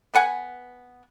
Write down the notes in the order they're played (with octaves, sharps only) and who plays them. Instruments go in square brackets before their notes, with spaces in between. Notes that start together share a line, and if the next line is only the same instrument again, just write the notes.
[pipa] B3 B4 F#5 G#5